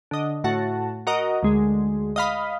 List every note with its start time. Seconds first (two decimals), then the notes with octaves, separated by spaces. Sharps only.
0.11 D3 D#5
0.44 A2 F#4 A5
1.07 F#4 A#4 D#5
1.43 D2 G#3
2.16 D#5 F5 B5